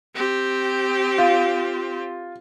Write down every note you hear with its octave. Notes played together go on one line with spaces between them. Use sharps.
C4 G4
F4